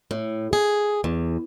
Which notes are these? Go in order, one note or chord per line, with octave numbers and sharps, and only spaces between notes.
A2
G#4
E2